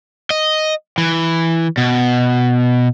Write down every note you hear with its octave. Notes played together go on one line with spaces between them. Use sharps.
D#5
E3
B2